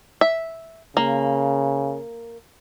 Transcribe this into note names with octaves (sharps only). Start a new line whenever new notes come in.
E5
C#3 A#3